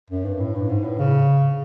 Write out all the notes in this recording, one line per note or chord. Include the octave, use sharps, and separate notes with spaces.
F#2
G2
A2
G2
G#2
A2
C#3